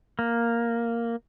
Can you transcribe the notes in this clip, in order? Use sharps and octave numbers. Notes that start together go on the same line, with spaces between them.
A#3